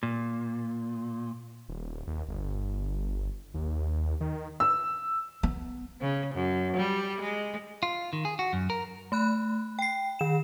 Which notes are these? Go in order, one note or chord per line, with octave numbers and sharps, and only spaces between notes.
A#2
D#1
D#2
G1
D#2
D#3
E6
B3
C#3
F#2
G3
G#3
F4
D#3
G#4
F#4
F#2
A#4
A3 B5 F#6
G5 C7
D#3 E7